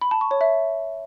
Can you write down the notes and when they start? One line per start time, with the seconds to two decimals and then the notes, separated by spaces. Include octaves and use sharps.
0.01 B5
0.11 A5
0.21 C#6
0.31 C#5
0.41 E5